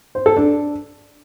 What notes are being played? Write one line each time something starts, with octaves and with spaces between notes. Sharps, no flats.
C5
A4
D4